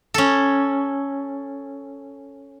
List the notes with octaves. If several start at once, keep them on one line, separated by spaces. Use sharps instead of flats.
C#4 A4